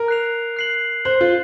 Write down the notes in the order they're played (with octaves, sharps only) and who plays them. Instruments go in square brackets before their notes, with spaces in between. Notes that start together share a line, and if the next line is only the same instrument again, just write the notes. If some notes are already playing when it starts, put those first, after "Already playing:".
Already playing: [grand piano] A#4
[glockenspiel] F#6 C7 F7
F#6 C7 F#7
[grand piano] C5 [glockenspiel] F#6 C7 F#7
[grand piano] F4